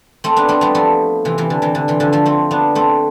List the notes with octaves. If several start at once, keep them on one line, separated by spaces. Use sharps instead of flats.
A3 C4
B3 D4
A3 C4
G3 B3
F3 A3
C3 E3
C3 E3
D3
C3 E3
D3
C3 E3
D3 F3
F3 A3
A3 C4
B3 D4
A3 C4